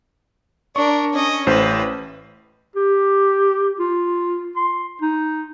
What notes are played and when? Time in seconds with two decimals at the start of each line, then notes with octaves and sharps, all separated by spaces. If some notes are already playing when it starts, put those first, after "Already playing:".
0.76 D4 A#4 C#6
1.13 C#4 D#5
1.47 A1 A2 B4 C5
2.76 G4
3.79 F4
4.57 C6
5.02 D#4